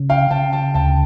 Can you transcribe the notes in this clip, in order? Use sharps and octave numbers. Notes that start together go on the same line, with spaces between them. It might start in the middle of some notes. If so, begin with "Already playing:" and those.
Already playing: C#3
F5 G5
C#3 G5 A5
G5 A5
D2 G5 A5